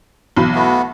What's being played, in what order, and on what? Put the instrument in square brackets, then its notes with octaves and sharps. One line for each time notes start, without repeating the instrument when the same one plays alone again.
[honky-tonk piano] B1 E3 B5
[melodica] A3 B3